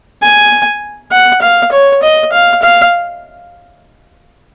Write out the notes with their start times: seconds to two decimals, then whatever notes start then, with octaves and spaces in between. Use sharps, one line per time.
0.23 G#5
1.12 F#5
1.42 F5
1.72 C#5
2.03 D#5
2.32 F5
2.62 F5